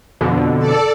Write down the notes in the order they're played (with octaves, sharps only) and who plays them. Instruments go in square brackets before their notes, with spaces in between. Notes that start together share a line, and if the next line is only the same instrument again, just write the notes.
[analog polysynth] F2 B2 D3
[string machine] A4 D5